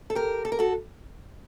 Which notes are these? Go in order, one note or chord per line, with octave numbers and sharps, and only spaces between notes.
A4
G4 A#4
A4
A#4
F#4 A4